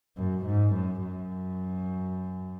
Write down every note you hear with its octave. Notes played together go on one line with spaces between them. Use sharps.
F#2
G#2
F#2
F#2